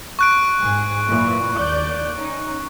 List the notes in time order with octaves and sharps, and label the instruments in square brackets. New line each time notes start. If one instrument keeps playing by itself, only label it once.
[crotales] C#6 F#6 D7
[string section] G#2 G#4
F#2 A#2 E3
D#2 D5 G6
C#4 D#4